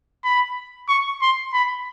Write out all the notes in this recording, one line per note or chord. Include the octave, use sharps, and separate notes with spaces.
B5
C#6
C6
B5